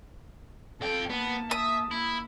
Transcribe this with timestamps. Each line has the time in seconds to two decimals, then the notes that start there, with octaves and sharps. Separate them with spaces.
0.81 F2 A4 G5
1.10 A#3 B3 A5
1.51 E5 D#6
1.91 A#3 E4